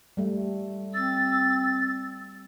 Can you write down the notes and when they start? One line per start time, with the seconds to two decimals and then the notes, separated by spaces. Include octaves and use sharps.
0.17 G3 A3
0.94 C4 E6 A6